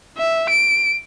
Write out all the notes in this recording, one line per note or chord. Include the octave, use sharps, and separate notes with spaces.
E5
D7